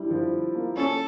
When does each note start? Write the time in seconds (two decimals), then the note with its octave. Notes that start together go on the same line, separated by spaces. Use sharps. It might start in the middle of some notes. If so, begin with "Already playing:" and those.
Already playing: G3 D4 E4
0.11 F3
0.55 A#3
0.77 C#4 A4